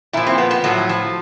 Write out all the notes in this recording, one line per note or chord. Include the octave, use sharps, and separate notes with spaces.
A#2 F3 E4
C4
B3
B3
A2 F3 F#3
F3